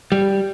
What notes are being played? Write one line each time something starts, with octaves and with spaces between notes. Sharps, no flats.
G3